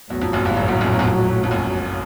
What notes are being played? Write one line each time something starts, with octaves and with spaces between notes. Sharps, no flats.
A#1 E2 A2 F#3
F2
F#1 F#2
G1 G2
G1 G2
G1 G2
F#1 F#2
E2
F#2
F2
F2
F#1 F#2